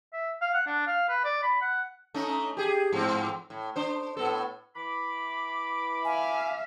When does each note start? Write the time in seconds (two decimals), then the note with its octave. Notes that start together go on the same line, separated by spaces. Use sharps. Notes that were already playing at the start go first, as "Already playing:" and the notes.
0.13 E5
0.41 F5
0.54 F#5
0.67 D4
0.87 F5
1.09 B4
1.24 D5
1.43 B5
1.61 F#5
2.14 A3 C#4 D#4
2.57 G4 G#4
2.93 G#2 F3 C4
3.50 A2
3.76 D4 C5
4.17 A2 B3 A4
4.76 E3 B5 D6
6.05 E5 F5 G#5